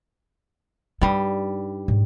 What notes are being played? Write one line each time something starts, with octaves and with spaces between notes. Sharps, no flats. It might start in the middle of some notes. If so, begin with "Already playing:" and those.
G2 G3 D#4
G#2